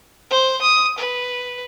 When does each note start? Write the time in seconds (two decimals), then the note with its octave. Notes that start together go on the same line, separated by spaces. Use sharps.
0.30 C5
0.62 D#6
0.98 B4